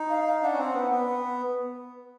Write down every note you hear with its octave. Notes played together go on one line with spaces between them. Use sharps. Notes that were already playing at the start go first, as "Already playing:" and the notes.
Already playing: D#4
F5
F5
D4 F#5
C#4
C4
B3
B3